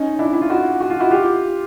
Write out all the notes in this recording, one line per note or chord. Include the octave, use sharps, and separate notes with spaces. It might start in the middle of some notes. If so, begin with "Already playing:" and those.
Already playing: C#4 D#4
D4 E4
E4
F4
E4 F#4
F#4
F4
E4 F#4
F4 G4